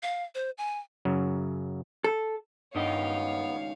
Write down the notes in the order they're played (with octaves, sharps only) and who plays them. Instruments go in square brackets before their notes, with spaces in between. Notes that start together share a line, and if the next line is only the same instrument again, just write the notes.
[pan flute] F5
C5
G#5
[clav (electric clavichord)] F#2 C#3 F#3
[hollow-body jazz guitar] A4
[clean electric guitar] C#2 D#3 D#5 [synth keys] G2 [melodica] B3 [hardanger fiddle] C#5 F5